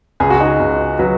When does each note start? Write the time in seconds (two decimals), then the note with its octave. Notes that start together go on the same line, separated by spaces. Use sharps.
0.20 C#2 G#4
0.30 F#4
0.40 D#4 G#4
0.59 C#2
0.99 F#3 F#4 B4